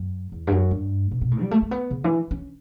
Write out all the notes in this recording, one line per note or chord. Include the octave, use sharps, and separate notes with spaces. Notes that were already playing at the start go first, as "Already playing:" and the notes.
Already playing: F#2
E2
G2
F#2
G2
B2
B2
A2
G3
A3
A3
B3
C#3
E3
C#4